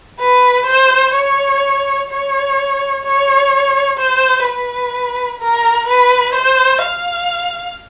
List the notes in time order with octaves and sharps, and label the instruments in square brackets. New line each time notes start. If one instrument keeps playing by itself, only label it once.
[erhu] B4
C5
C#5
C#5
C#5
C5
B4
A#4
B4
C5
F5